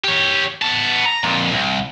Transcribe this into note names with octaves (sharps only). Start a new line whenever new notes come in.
G4 C#5
B3 A5
A#5
F2 A#2
C2